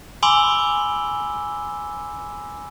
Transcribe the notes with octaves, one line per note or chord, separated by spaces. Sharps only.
G#5 B5 C6 D6 E6 G7